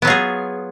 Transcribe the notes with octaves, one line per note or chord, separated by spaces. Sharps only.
F#3 B3 F4 G#4